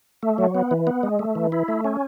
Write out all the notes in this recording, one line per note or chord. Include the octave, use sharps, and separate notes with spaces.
A3
F#3
B3
E3
B3
G#3
A3
E3
E4
A3
C#4